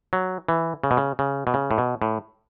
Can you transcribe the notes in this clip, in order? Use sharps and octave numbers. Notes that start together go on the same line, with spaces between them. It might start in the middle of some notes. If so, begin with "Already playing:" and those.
F#3
E3
C#3
B2
C#3
C#3
B2
C#3
A2
B2
A2